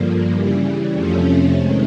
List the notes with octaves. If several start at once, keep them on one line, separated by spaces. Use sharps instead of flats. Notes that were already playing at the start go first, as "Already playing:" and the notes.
Already playing: G2 D3 F3 A#3
C#3 E3 G3
F2 C3 F3 A3 C#4
C3 D#3 G#3